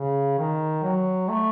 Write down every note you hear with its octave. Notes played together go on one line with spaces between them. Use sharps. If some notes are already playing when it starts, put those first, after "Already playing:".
Already playing: C#3
D#3
F#3
A3